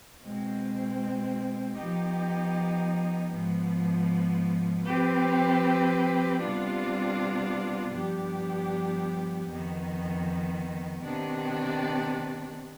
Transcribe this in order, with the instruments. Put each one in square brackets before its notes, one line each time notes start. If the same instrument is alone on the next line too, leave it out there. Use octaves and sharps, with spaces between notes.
[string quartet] B2 G#3 C4
F3 B3 D#4 G4
G#2 F3 B3
F3 C4 G4 B4
C3 G3 B3 D4 F4
G2 F3 B3 D4 G4
F2 D#3 B3
C3 D#3 B3 D4